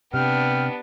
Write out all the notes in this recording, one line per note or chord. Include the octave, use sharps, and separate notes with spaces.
C3 B3 D4 G5 F6